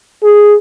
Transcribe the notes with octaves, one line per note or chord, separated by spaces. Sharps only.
G#4